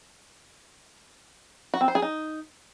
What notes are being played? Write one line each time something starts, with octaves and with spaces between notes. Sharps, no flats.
F#4
C4
C5
G#4
D#4